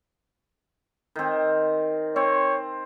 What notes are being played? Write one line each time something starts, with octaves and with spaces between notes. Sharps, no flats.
D#3 C4
C4 C#5